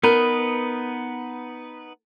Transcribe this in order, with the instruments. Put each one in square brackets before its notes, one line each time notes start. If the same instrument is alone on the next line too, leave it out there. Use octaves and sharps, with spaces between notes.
[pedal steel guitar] B3 D#4 B4 [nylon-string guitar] A#4